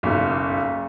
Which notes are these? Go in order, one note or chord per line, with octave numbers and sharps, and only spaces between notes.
F#1 B1